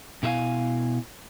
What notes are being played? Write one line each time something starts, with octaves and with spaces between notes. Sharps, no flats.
B2 E4 G#4 E5 F5 G#5